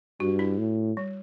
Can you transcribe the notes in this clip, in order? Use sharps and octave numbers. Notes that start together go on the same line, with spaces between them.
G2 F#4
E4
A2
G3